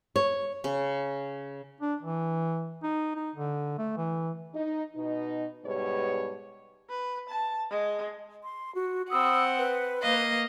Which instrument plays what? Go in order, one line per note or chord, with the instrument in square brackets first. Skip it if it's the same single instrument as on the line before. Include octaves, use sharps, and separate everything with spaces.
[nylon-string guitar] C#5
[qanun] C#3
[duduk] D4
E3
D#4
D#4
D3
A3
E3
[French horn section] D#4
B2 D#4
G#2 B2 G3 G#4 B4 C#5
[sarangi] B4
A5
G#3
[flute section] C6
F#4
[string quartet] C4 F#5 [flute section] B5 D#6 E6
[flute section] B4
[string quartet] A#3 D#5 F5